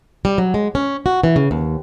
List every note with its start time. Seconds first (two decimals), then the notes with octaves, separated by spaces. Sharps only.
0.25 G3
0.38 F#3
0.54 G#3
0.75 C#4
1.06 F#4
1.24 E3
1.36 C#3
1.51 D#2